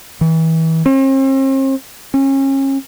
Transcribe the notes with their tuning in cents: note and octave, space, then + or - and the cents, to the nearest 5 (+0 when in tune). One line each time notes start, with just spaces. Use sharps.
E3 -30
C4 +45
C#4 -30